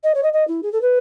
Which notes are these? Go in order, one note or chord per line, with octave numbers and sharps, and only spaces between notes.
D#5
C#5
D#5
D#5
E4
G#4
A4
B4